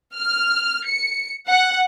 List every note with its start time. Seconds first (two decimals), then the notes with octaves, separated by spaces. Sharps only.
0.14 F6
0.86 C#7
1.48 F#5